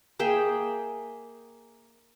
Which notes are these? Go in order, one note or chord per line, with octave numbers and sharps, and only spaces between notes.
A#3 G#4 E5 G5